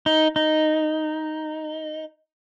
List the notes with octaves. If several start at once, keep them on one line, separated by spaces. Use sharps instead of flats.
D#4
D#4